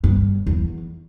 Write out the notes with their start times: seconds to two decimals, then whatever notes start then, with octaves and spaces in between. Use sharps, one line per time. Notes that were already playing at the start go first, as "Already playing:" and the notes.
0.04 G2
0.47 E2